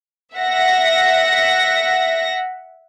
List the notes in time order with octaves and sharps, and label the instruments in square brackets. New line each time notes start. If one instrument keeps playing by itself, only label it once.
[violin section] E5 F#5 A#6